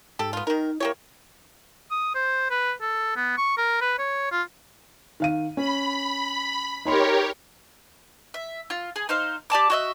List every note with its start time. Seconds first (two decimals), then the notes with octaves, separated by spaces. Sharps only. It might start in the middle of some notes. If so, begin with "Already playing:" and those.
0.19 G#2 G4 A4
0.33 B3 F4
0.47 D#3 D#4 A#4
0.80 A#3 E4 G4 C#5
1.91 D#6
2.15 C5
2.51 B4
2.81 A4
3.16 B3
3.38 C#6
3.58 A#4
3.81 B4
3.99 C#5
4.32 F4
5.20 D#3 F5 D#7
5.57 C#4 B5
6.85 D#4 G4 A#4 C#5 B5 C6
8.34 E5
8.70 F4
8.96 G#4
9.09 D#4 C5 F5
9.50 G4 D5 A5 D6
9.70 F#4 D#5 E5